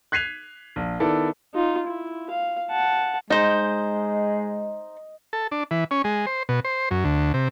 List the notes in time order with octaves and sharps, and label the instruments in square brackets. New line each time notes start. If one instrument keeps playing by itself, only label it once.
[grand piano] F#6 G#6 B6 C7 D#7 F7
A#1
D#3 B3 E4 A4 D5
[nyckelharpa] D#4 F4
E4
F5
F#5 A5
[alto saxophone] G#3 [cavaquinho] D#4 C5 [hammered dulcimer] D#5
[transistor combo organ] A4
D4
E3
C#4
G#3
C5
B2
C5
F#2
D2
C3